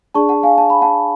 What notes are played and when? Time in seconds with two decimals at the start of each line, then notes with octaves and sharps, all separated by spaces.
0.14 D4 G#4 D5 A5 C#6
0.29 F#5 A5
0.43 F5 G#5
0.58 A5
0.70 B5
0.82 F#5 A5